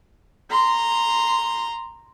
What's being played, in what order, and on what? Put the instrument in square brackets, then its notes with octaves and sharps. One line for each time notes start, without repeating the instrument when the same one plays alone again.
[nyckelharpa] A#5 C6